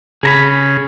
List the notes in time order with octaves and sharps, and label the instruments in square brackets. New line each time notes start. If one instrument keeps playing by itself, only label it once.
[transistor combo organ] C#3 [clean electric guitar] G#4 A#5 B5